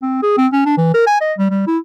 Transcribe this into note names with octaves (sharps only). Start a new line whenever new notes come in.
C4
G#4
C4
C#4
D4
E3
A#4
G#5
D#5
G3
G3
E4